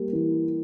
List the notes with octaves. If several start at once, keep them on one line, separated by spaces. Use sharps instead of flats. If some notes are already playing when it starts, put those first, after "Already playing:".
Already playing: G3 A#3
E3